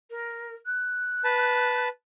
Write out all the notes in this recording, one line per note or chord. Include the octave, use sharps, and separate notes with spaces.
A#4
F#6
B4 A5